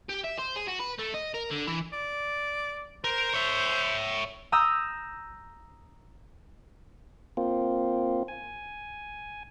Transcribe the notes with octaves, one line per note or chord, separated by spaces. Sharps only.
G4
E5
C5
G#4
F#4
B4
A3
D#5
A#4
D3
E3
D5
A#4 C5
C#5 E5
A#5 D#6 E6 G6
A#3 C4 F4
G#5